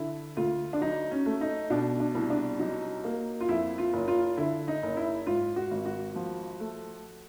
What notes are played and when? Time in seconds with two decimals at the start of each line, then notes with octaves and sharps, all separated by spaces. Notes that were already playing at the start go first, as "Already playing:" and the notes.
Already playing: D3 E4
0.37 D2 F4
0.73 D4
0.81 F#3 D#4
1.11 C#4
1.26 A3
1.41 D#4
1.70 B2 D4
2.00 D4
2.15 C2
2.30 D4
2.59 F#3 D#4
3.04 A#3
3.41 F4
3.49 F2 E4
3.78 F4
3.93 F#1
4.08 F4
4.37 D3 E4
4.68 D#4
4.83 F#1
4.97 E4
5.27 G#2 F4
5.56 F#4
5.71 G#1
5.85 F#4
6.15 F3
6.60 A3